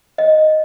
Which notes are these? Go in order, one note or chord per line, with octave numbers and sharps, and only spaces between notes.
D#5